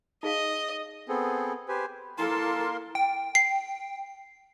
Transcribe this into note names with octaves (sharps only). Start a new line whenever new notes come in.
D#4 G#4 D#5 F5
B3 C4 G#4 A4
G4 B4 C5 G#5
A#3 E4 A4 A#4 A5 C6
G5
C7